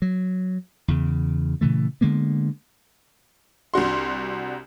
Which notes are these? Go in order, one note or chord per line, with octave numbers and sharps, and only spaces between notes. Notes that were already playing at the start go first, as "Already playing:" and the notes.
F#3
E2 C#3
A#2 C#3 E3 A3
D3 G#3 A#3 B3
C2 D4 F#4 C6